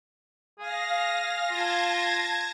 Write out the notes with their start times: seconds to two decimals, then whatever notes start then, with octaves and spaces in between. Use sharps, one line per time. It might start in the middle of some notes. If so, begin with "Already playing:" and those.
0.59 G#4 F5 A#6
1.51 F4 A5 G#6 A#6